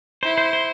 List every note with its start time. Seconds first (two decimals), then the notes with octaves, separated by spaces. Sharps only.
0.23 E4 C5
0.38 C5
0.53 C5